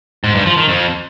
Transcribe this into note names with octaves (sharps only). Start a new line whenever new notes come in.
G#2
G2
F3
D#3
F2